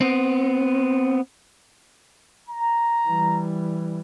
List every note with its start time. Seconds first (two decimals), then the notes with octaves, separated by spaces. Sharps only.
0.01 B3 C4
2.48 A#5
3.06 E3 G3